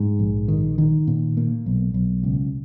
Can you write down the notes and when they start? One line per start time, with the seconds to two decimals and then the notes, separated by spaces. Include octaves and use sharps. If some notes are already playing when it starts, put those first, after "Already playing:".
Already playing: G#2
0.19 A#1
0.48 D#3
0.78 D#3
1.07 A#2
1.37 A#3
1.66 B1
1.94 B1
2.23 C#2